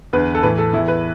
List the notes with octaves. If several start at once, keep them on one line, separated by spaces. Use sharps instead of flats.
E2 D3 B4
A4
A2 E3 B4
A4
E2 E3 E4
B4